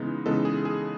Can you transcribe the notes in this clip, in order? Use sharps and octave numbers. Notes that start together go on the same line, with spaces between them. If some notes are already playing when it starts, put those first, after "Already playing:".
Already playing: C#3 E3 G#3 B3 D#4
C#3 E3 G#3 B3 D#4 A4
G#4
G#4